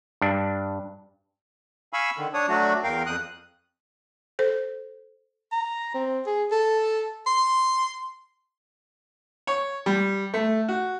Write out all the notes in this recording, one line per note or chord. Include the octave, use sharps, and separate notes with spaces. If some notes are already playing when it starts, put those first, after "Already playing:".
G2 D4
F5 G#5 B5 C#6 E6
D3 D#3
D4 C#5 D#6
F#3 A3 D4 F#4
E2 A#4 F5 G5
F2 D#6 F#6
A4 C5
A#5
C4
G#4
A4
C6
C#5
G3
A3
F#4